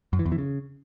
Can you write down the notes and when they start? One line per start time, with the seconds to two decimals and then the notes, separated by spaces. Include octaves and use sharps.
0.13 F#2
0.19 E3
0.26 E2
0.32 E3
0.38 C#3